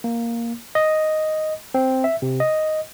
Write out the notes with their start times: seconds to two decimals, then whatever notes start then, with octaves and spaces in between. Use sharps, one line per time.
0.04 A#3
0.75 D#5
1.74 C4
2.04 E5
2.22 C3
2.40 D#5